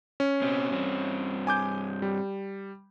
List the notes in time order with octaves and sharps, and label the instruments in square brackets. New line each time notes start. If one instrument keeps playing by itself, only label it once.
[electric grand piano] C#4
[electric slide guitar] B2 C4
G2 C4
[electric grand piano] G#5 D6 G6
G3